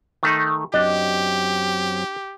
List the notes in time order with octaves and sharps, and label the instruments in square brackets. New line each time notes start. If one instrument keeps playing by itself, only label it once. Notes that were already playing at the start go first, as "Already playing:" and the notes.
[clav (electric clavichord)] D#3 A3 D#4
[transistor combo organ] F#2 F#3 C4 [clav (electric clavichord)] D4 [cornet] G4 [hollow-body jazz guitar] D#5